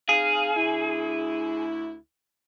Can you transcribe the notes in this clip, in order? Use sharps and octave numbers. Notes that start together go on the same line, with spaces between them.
C4 D#4 G#4 F5
D2 E4